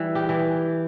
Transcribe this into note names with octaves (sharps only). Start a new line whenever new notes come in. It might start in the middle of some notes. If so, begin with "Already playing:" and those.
Already playing: E3 G3
G4
E3